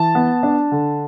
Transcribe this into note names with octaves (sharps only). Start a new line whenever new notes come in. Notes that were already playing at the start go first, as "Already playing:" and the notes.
Already playing: E3 A5
B3
D4
D3